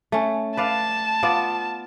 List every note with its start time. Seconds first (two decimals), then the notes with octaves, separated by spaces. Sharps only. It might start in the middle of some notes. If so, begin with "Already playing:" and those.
0.12 A3 C#4
0.57 B4 D5 F5 A5
1.23 B3 F4 D5